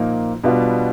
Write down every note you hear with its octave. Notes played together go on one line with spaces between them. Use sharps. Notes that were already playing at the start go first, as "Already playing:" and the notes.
Already playing: A#2 F3 A#3 D#4
B2 G3 B3 D4 F4